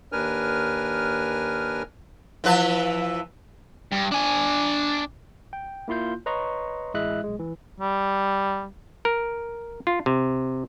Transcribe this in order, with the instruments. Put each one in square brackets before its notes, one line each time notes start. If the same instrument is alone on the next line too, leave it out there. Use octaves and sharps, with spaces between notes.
[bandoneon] D#2 D4 A#4 B4 G#5 F6
[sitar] E3 F3 B4
[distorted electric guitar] G2
D4 G#5
[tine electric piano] G5
A#3 E4 F4 C6 G6
B4 C#5 D#5 A#5 C6 C#6
A1 G#3 E4 D#5 E5 F#6
B1 G#3
E3
[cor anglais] G3
[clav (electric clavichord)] A#4
F4
C3